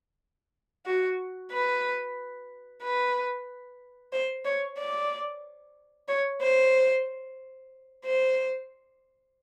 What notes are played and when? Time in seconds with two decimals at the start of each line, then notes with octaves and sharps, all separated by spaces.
0.86 F#4
1.53 B4
2.83 B4
4.13 C5
4.45 C#5
4.79 D5
6.08 C#5
6.41 C5
8.05 C5